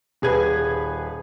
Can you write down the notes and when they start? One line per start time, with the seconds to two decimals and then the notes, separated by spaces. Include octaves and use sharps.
0.22 D#1 G#4 B4 G#6